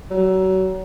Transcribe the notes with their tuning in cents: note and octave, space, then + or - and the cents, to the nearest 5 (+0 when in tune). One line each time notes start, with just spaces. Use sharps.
F#3 +30